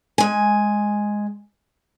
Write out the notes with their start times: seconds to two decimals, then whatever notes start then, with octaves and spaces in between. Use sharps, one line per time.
0.18 G#3 G#5